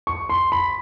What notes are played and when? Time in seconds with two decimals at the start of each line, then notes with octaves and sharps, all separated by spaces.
0.07 C#6
0.29 C6
0.52 B5